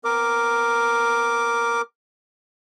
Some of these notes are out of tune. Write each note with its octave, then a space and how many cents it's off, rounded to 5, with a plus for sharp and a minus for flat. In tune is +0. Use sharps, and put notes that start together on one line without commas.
B3 +45 A#4 +0 D6 +0